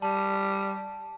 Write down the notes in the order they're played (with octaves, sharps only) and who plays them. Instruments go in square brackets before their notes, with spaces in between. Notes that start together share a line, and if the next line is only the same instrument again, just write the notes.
[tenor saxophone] G3 [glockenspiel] A5